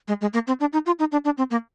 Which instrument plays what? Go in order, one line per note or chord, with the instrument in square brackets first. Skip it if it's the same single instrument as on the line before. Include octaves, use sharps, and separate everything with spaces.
[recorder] G#3
G#3
A#3
C4
D4
D#4
F4
D#4
D4
D4
C4
A#3